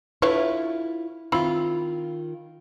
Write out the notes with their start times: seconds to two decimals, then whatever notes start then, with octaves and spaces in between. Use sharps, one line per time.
0.22 D3 E4 F4 B4 C#5
1.32 D#3 C4 E4 F4 B5